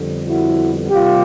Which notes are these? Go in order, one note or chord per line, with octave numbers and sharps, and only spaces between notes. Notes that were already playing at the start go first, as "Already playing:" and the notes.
Already playing: F2 D3 G3 B3
E4 F#4
C3 D#3 G3 A#3 F4 G4